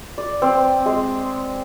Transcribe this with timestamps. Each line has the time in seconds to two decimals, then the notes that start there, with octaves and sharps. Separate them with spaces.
0.18 D5
0.42 C4
0.86 G#3